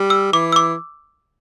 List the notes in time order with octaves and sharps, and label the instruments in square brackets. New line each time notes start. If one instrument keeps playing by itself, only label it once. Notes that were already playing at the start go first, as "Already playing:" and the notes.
Already playing: [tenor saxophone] G3
[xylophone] E6
[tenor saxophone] E3 [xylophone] D6
[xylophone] E6
D6